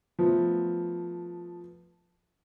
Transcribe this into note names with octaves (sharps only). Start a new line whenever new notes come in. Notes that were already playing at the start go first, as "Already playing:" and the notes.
F3 A3 B3